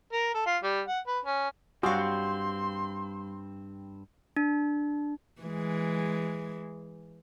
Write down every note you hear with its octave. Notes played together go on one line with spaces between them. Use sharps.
A#4
A4
F4
G3
F#5
B4
C#4
G2 G3 C4 F#4 G4 F5 C6
D4
E3 G#3